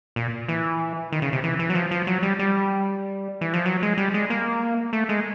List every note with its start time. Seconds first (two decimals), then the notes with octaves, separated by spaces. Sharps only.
0.16 A#2
0.48 E3
1.12 D#3
1.22 C#3
1.33 C3
1.44 E3
1.59 E3
1.70 F#3
1.75 F3
1.91 F3
2.07 F#3
2.23 G3
2.39 G3
3.41 E3
3.54 F3
3.66 F#3
3.82 G#3
3.98 G3
4.14 G#3
4.30 A#3
4.93 A3
5.09 G#3